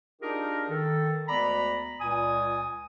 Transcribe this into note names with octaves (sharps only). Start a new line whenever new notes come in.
D4 D#4 F4 G4 G#4 A#4
D#3 A4
D2 G#3 B3 D5 A#5 B5
C#2 A#2 G#5 D#6